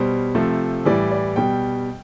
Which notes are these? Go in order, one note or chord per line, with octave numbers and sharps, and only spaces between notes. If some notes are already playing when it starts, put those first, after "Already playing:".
Already playing: B2 G3 C5
C3 F3 A3
A2 E3 G3 D5
D5
B2 G3 G5